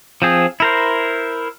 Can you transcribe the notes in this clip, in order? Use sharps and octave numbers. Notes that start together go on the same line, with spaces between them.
F3 C4 G#4
E4 A#4 C5